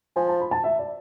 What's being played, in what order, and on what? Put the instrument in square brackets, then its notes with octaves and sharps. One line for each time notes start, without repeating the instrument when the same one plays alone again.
[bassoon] F3 [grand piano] G#5
[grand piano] A5
B5
A5
E5
D5